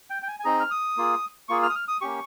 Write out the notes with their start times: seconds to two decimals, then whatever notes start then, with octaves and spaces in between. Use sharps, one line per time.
0.10 G5
0.22 G5
0.28 G#5
0.40 G#5
0.44 C4 D#4 G#4 A#5
0.60 F6
0.71 D#6
0.97 A#3 F4 G#4
1.49 A#3 F4 G#4 C#6
1.63 F6
1.70 D#6
1.75 F6
1.88 D#6
2.01 A#3 C#4 G4 C#6